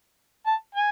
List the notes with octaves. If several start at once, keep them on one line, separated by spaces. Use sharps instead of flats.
A5
G#5